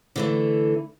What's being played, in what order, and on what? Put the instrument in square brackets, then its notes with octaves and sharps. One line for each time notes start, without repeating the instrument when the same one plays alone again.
[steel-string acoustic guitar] D3 E3 A3